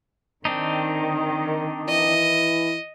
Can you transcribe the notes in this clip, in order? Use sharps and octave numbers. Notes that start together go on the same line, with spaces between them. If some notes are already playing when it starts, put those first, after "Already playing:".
D#3 C4 D4 D#4
E3 E4 D#5